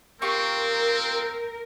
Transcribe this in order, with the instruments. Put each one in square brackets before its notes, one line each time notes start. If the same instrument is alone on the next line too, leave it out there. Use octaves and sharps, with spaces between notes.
[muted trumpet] C4 [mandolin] F4 G4 C#6 [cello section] A#4